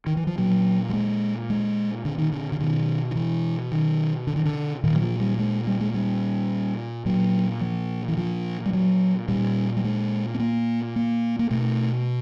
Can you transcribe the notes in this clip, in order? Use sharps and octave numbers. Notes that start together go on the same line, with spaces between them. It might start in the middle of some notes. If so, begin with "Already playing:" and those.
D#3
E3
F3
A#2 F#3
G3
G#3
G#3
D3
D#3
D3
D3
B2 D#3
D#3
E3
D#3
D3
D#3
D3
A#2 D#3
F#3
F3
G3
G#3
G3
G#3
G3
A#2 F#3
F3
E3
F3
G3
F#3
A#2 G3
G3
G#3
B3
A#3
A#3
A#3
B2 A3